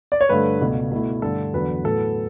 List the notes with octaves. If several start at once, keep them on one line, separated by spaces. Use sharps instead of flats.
D5
C#5
G2 D3 A3 D4 B4
C#2 B2 A3
B2 A3 E4
G2 D3 A3 A4
E2 D3 F#3 B4
A2 F#3 B3 A4